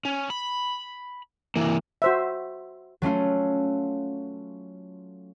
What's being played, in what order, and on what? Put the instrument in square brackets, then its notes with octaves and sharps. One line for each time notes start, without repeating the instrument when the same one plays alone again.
[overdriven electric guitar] C#4
B5
E3 A#3
[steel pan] F#4 C5 E5
[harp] F#3 A3 C#4 F4